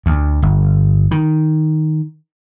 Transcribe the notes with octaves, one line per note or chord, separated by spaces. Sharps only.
D2
G1
D#3